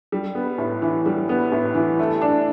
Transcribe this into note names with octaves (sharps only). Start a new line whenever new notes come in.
G3
B3
A2
E3
G3
B3
A2
E3
A3
D4